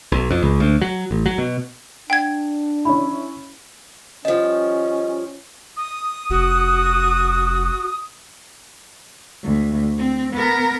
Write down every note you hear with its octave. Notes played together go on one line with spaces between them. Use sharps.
B1
F2
C#2
D2
F#3
A1
F#3
B2
D4 F#5 G5 G#6
C#4 E4 B5
F3 G3 C#4 D#5
D#6
F1 F#4
D2
C4
B3 A#4